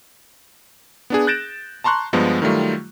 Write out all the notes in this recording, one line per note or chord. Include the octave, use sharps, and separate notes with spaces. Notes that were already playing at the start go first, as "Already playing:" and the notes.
B3 D4 G#4
F#6 G6 A6 A#6 D7 E7
A5 A#5 C6 C#6 F#6
G2 F3 G#3 B3
D#3 F#3 G3 A3 F4